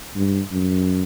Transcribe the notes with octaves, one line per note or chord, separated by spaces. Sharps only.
G2
F#2